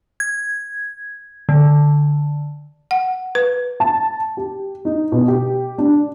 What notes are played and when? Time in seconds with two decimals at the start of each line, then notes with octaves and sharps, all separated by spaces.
0.20 G#6
1.49 D3
2.91 F#5
3.35 B4
3.80 A5
4.37 G4
4.85 D#4
5.12 B2
5.28 G4
5.78 D4